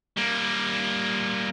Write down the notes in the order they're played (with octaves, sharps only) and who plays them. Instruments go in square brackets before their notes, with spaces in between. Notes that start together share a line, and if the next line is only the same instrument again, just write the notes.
[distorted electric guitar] G3 A#3